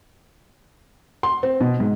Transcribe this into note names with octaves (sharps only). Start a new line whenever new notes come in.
C6
C4
B2
G#2